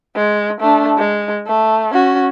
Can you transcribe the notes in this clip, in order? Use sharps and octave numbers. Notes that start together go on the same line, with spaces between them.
G#3
A3 D4
G#3
A3
C#4 F#4